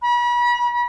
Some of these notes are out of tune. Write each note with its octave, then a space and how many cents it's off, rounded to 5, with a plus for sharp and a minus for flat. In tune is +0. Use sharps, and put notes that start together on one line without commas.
B5 -40